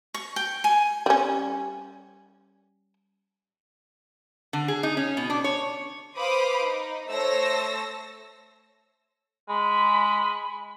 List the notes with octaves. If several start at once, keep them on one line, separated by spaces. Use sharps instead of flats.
C#6
G5
G#5
G3 C#4
D3
G#4
D#4
C#4
B2
D4
C#5
B4 C5 F5 B5 D6 D#6
D#4
A3 C5 C#5 A5 E6 A#6
G#3 B5